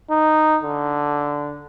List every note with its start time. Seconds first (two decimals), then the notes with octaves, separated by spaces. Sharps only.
0.10 D#4
0.63 D3